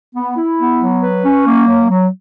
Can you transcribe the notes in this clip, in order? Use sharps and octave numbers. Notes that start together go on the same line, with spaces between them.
B3
E4
B3
F#3
B4
C#4
A#3
F#3
F#3